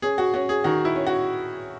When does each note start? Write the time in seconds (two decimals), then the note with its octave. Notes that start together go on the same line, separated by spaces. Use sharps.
0.02 C#4 G#4
0.18 F#4
0.34 C#4 F#4
0.49 G#4
0.64 D#3 F#4
0.85 E4
0.96 C#4
1.06 F#4